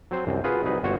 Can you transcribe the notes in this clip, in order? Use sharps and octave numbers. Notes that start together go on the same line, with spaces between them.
F#3 C4 C5
C2 F#2
F4 F#4 G#4 B4
C2 F#3 D#4 B4
G1 F#4 C5 C#5